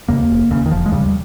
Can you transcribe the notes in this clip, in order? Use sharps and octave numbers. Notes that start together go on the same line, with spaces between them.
D#2 C#3 A#3
F1
D#2 C#3
D#3
F1 F3
G#3
D#2 C#3 G3